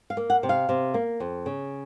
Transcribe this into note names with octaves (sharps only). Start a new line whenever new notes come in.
F5
A#3
F#5
C3
F5
C3
A#3
F2
C#3